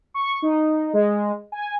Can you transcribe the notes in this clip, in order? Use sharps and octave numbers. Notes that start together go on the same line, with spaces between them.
C#6
D#4
G#3
G#5